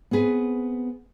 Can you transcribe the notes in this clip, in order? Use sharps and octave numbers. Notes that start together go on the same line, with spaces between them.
B3 C4 G#4 B4